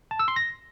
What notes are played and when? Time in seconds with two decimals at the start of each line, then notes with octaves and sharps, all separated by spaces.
0.11 A5
0.19 E6
0.28 C6
0.36 A#6